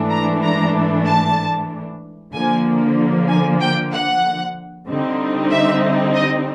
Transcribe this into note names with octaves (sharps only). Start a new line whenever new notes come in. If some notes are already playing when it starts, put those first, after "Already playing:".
Already playing: G#2 E3 A3 D4
A#5
A#5
A5
D3 F3 A#3 G#5
G#5
G5
F#5
D3 G3 C4 D#4
E5
D#5